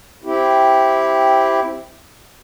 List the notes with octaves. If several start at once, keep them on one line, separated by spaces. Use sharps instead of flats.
C4 E4 G4